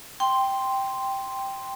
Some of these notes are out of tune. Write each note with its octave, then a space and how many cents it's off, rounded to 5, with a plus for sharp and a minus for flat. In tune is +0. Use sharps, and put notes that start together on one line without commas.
G5 +0 C6 +0